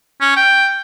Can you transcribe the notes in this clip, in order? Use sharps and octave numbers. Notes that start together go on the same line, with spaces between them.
C#4
G5